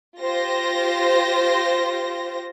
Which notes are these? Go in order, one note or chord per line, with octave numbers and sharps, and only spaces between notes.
F4 G4 C5 A#6